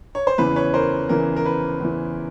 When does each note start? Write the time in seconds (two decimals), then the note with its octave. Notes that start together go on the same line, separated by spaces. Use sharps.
0.15 C#5
0.27 C5
0.38 E2 C#3 E3 B4
0.56 B4 C#5
0.74 A#4 C5
1.09 E2 C#3 E3 A#4
1.36 A#4
1.45 B4
1.80 E2 C#3 E3